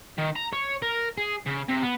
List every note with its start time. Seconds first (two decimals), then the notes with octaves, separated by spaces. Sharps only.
0.18 D#3
0.36 A#5
0.53 C#5
0.82 A#4
1.17 G#4
1.46 C#3
1.69 C3
1.82 B3